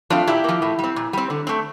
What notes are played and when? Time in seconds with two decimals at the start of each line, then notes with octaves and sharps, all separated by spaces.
0.10 F3 A3 C4 D4 F4
0.27 A#2 E4 G4
0.44 F3 A#3
0.62 A2
0.79 G3 C4
0.96 A#2
1.13 G3 C4
1.30 D3
1.47 A3 C4